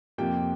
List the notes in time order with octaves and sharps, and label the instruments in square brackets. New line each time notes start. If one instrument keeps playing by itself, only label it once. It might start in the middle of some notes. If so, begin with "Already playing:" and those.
[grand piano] F2 C3 F3 A#3 G4 G5